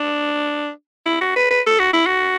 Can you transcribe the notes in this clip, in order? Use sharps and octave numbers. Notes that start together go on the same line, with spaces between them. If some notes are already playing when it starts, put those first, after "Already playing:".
Already playing: D4
E4
F#4
B4
B4
A4
F#4
E4
F#4